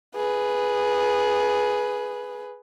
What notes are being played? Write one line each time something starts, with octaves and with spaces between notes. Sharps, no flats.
G#4 B4